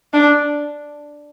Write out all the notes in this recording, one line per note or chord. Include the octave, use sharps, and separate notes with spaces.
D4